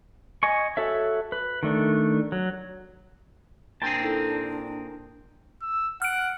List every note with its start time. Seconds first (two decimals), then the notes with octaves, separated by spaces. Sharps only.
0.43 D#5 G#5 C#6
0.77 F#4 A4 C#5 E5
1.32 B4
1.63 D#3 A3 D4
2.32 F#3
3.82 A#2 C4 D4 G#4 A#4 G5 A5
4.01 D#4 E4 A4
5.62 E6
6.02 F#5 F6 D7